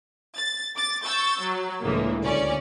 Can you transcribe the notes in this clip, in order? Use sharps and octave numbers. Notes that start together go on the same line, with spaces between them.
A6
D6 A6
C#6 E6 G6 A6
F#3
C#2 A2 D3 E3 G#3 A#3
D2 C#4 D5